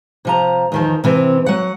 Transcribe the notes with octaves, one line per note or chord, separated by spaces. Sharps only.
C3 F3 A#5
E2 D#3 F3
C3 E3 C4
F#3 F#5